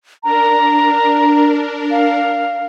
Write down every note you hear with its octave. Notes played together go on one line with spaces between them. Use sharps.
D4 A#4 A#5
F5